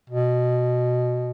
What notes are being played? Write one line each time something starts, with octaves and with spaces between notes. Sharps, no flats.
B2